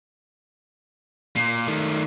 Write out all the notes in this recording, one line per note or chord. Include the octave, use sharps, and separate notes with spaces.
A#2
D#3 A3